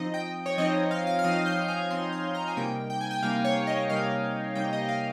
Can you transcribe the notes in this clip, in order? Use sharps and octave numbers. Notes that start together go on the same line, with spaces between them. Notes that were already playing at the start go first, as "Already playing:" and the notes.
Already playing: F3 C4 D#4 D#5
G5
C#5
F3 C4 D#4 D#5
F5
F5
F6
F3 C4 D#4 D#6
G6
G#5
F3 C4 D#4 C6
C6
A#5
G#5
C3 G3 A#3 D#4 G5
G5
G#5
G5
C3 G3 A#3 D#4 F5
C#5
D#5
C3 G3 A#3 D#4 F5
C3 G3 A#3 D#4 G5
D#5
F5